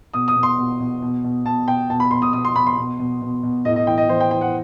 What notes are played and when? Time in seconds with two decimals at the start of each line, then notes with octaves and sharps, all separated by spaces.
0.14 B2 D#6
0.28 D#6
0.36 B2
0.43 C6
0.58 B2
0.80 B2
1.02 B2
1.24 B2
1.45 B2 A5
1.68 B2 G5
1.90 B2 A5
2.00 B5
2.11 B2 C6
2.22 D#6
2.33 B2 D#6
2.45 C6
2.55 B2 B5
2.67 C6
2.77 B2
2.99 B2
3.22 B2
3.43 B2
3.65 A2 D#5
3.76 D#5
3.87 E3 G5
3.98 D#5
4.08 E3 C5
4.20 G5
4.31 E3 G5
4.41 F#5